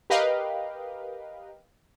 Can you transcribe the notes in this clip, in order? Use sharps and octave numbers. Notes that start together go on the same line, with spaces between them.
G4 A#4 B4 D#5 F5 G5